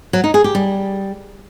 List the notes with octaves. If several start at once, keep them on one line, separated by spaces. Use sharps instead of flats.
F#3
D#4
G#4
G4
G3